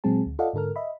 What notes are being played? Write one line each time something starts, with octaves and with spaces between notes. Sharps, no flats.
A#2 F#3 G#3 C4 G#4 A5
D2
F4 A4 D5 D#5 F5 F#5
G#2 D3 A4 A#4 F6
D#5 E5 B5